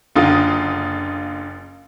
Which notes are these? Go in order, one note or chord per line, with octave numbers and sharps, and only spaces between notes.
F#1 D3 F4 D#6